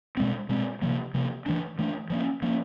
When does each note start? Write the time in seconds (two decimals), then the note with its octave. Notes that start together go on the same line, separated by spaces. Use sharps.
0.17 B2 G#3 C4
0.49 B2 G#3 C4
0.82 C3 F3 A#3
1.14 C3 F3 A#3
1.46 E3 A3 D4
1.78 E3 A3 D4
2.10 F3 A#3 C#4
2.42 F3 A#3 C#4